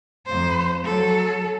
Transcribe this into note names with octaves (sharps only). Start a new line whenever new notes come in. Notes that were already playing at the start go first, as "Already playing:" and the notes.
F2 C5
F#3 A4